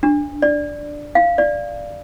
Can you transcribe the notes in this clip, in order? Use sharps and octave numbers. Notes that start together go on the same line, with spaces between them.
D4
D5
F5
D5